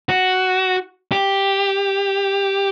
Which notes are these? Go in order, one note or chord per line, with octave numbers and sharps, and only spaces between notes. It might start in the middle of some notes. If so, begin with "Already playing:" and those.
F#4
G4